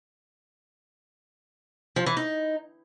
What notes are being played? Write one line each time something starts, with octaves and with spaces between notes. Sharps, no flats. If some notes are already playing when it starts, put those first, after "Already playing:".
F3
E3
D#4